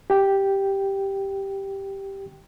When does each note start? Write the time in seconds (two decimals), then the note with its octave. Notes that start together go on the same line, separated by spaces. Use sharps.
0.10 G4 G5